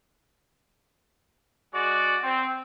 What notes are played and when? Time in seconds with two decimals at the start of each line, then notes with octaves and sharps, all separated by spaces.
1.74 G#3 F#4 D5
2.23 C4